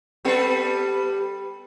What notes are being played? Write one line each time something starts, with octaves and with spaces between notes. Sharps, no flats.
G3 B3 A4